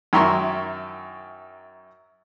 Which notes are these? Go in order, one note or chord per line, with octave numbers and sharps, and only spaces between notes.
F#2 D#3 E4 A#5 C6 C#6